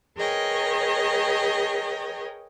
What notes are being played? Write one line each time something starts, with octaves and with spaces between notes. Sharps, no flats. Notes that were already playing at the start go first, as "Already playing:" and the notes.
G#4 A#4 B4 C#5 D#5 G5